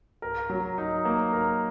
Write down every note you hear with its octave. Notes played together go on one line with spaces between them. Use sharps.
A#4
F#3
D#4
A#3
A#4